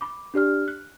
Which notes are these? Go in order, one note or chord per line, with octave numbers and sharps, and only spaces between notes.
B5 D6
D4 G4 D5 F6
F#6